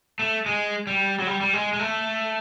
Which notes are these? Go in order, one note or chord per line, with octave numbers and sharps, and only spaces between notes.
A3
G#3
G3
F#3
G3
G3
G#3
G#3
A3